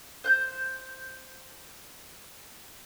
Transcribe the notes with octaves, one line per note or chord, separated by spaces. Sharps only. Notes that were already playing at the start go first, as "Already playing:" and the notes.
C5 F#6 G6